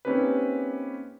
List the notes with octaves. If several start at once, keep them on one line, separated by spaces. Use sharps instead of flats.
A#3 C4 C#4 D#4 G4 B4